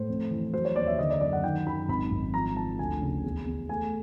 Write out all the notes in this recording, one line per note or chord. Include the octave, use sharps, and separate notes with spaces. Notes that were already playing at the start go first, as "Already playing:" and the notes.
Already playing: A2 C5
F2
E3
F#3 C5
C#5
D#2 D5
E5
D3 D#5
D5
F#2 D5
F#5
D#3 G5
F#2 B5
G#1 B5
G#1
F3 A#5
F3 A5
D2 G#5
C#3
E2
E2
A3 G#5